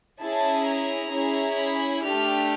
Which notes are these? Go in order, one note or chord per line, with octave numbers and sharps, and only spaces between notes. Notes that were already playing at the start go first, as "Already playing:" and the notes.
C#4 E4 G#4 A5
A#5
C#4 E4 G#4
B5
A3 D4 G4 F6